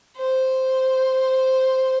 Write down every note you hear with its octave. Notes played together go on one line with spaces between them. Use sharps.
C5